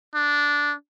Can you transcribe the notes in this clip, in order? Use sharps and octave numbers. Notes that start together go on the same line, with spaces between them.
D4